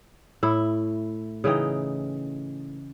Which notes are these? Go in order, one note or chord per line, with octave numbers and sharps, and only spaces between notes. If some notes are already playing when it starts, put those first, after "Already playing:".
A2 E4
C#3 E3 D#4 G5